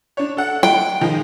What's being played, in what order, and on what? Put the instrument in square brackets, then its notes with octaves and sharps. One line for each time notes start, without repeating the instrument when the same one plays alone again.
[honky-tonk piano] D4 C#5
A4 F#5
[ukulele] G5
[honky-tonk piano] D#3 F3 G#3